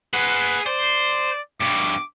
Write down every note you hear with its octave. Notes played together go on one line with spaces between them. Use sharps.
G#4 B4 F#5
C5 D5
G2 B2 D6